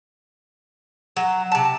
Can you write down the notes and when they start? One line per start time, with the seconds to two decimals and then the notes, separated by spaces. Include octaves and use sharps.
1.17 F#3
1.52 C3 A5